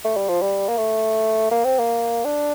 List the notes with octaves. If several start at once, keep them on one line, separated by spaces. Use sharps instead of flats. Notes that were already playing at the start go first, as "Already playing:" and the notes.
A3
G3
F3
G3
A#3
A3
A#3
C4
A#3
D4